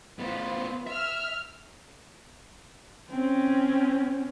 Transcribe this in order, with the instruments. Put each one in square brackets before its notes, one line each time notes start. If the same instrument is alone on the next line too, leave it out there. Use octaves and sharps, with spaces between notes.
[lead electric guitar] A2 B3 [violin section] F4 B4 C5
[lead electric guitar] E5 [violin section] E6 F6
[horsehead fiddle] C4 C#4